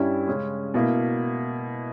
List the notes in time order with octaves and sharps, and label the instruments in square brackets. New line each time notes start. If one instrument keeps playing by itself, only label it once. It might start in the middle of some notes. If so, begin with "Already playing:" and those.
Already playing: [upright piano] G2 G3 C#4 E4
C#3 G#3 C#4
B2 A#3 E4